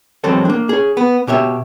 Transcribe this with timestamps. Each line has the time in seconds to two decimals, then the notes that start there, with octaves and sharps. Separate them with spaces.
0.24 E3 F#3 G#3 C4 A4 C5
0.45 A#3 D4
0.69 G#4 C#5
0.97 B3
1.27 B2 G4 C#5 E5